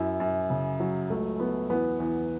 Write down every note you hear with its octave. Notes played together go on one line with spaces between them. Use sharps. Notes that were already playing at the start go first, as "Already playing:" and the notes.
Already playing: F#2 E4
F#2
C#3
F#3
C#2 A3
F#3 B3
E2 B3
E2